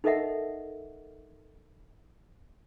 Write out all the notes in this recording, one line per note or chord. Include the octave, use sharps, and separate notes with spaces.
D#4 A4 A#4 D#5 E5 F#5